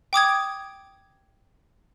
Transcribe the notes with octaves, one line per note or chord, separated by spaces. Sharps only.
G5 D6 D#6 G#6